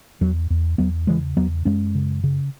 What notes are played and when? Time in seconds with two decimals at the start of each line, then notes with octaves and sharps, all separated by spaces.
0.21 E2 F#3
0.50 E2
0.78 E2 F#3 B3
1.07 C#3 E3 G#3
1.37 E2 F#3 B3
1.65 F#2 G#3 C#4
1.95 C#3
2.24 C#3